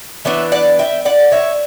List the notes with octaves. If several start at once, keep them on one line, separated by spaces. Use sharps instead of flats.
E3 B3 D4 C#5 E5
D5 F#5
E5 G5
D5 F#5
C#5 E5